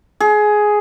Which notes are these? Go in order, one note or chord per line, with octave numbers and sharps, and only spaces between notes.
G#4